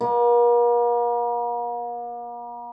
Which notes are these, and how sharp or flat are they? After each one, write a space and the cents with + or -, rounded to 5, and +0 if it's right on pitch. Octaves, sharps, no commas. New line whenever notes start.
A#3 +40